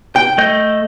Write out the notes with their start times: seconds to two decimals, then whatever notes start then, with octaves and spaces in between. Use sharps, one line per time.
0.16 G5
0.38 A3 D#5 G6